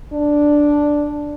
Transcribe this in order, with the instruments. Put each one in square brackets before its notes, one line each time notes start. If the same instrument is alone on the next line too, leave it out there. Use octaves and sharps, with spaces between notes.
[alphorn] D4